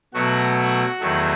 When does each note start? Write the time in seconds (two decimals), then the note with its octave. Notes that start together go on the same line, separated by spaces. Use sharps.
0.14 B2 F#3 A3 F#4
1.00 E2 D#3 F#3 A3